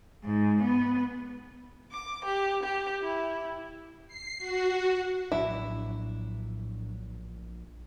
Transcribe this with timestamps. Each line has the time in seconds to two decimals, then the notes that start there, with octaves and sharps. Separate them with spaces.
0.25 G#2
0.63 B3
1.93 D6
2.25 G4
2.64 G4
3.02 E4
4.07 C7
4.38 F#4
5.32 A#1 A2 F#3 D4 E4